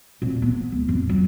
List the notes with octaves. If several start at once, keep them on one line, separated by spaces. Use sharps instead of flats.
F2 A#2
B3
C#2
A1 F2
F#3